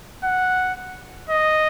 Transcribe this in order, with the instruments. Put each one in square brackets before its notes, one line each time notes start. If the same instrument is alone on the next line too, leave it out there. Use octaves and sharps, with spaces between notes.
[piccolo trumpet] F#5
D#5